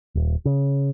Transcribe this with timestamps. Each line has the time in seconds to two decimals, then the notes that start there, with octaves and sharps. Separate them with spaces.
0.15 D#1
0.45 C#3